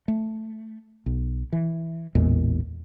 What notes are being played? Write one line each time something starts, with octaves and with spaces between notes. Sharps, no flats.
A3
B1
E3
A1 E2 A#2 G#3